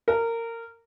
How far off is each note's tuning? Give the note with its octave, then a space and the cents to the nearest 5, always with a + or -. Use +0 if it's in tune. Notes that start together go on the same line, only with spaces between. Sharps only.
A#4 -20